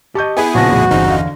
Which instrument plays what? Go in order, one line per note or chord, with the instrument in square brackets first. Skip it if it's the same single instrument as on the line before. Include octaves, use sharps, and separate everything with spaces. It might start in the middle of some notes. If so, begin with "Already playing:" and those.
[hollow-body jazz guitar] G4 D#5 [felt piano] A5 C#6 G6
[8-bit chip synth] B3 E4 G#4 [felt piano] G#5 B5
[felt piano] A#1 A5 A#6 [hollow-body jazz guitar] A#2 C#3 [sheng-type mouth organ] F#4
[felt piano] B1 E2 A2
[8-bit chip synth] G1 C#3 D#4 [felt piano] G2 [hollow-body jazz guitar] E3 C4
[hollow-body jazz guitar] E2 [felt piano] D3 F5